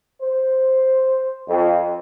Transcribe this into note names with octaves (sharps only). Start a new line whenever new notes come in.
C5
F2